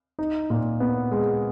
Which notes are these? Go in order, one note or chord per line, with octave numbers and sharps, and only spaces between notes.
D#4
A#2
B3
G#3